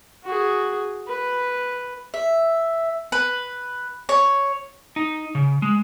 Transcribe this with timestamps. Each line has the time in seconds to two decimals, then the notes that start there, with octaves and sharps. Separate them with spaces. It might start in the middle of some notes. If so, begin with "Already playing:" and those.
0.24 F#4 G#4
1.08 B4
2.14 E5
3.12 B4
4.09 C#5
4.96 D#4
5.35 C#3
5.62 G#3